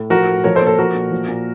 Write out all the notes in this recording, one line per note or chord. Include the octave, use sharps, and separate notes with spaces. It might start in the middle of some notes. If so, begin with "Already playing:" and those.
Already playing: A2
F3 F#4 A#4
A2
F3 A#4 C#5
A4 C5
A#2
A4 C5
F3 F#4 A#4
A#2
F3
A#2